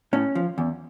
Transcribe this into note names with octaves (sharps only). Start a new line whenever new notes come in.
A2 C#4
F3
E2